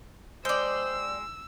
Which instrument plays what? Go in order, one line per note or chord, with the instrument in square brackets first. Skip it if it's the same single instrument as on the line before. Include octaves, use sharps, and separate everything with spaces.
[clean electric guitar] G#3 [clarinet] C5 [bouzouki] D5 G5 [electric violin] E6